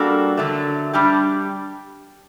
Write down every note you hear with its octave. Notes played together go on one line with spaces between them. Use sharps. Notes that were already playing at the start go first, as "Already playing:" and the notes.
Already playing: G3 A#3 D4 F#4 A4
D3 F#3 A3
G3 D4 G4